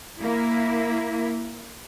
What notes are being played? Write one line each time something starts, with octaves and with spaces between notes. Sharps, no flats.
A#3 E4